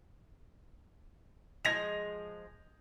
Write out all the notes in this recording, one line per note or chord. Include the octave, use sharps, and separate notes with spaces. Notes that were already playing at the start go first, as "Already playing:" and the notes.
F3 G#3 G#6 A#6 F7